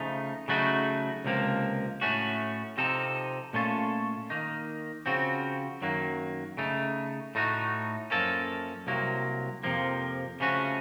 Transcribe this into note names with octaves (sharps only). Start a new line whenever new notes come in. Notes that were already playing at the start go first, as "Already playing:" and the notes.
Already playing: C#3 F3 A3 D#4
C#3 F#3 A3 D#4 F#4
C#2 C3 F3 A#3
A2 A3 C#4 F#4
C3 F3 C4 D#4 A4
A#2 A3 C#4 F4 A4
D#3 A#3 D#4
C#3 F3 C4 F#4
F#2 D#3 F#3 A#3
C#3 A3 D#4
A2 A3 D#4 F#4
F#2 F3 A#3 C#4 A4
C2 C3 F#3 A#3
F2 C3 F3 A#3
C#3 F3 A3 C#4 F#4